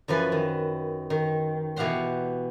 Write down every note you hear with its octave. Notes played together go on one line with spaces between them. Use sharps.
F#2 E3 F3 B4 G#5
D#3
D#3
B2 E3 G4 F5 F#5 C6